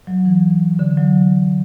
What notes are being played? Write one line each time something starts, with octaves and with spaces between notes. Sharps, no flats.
F#3
E3
D3
F#3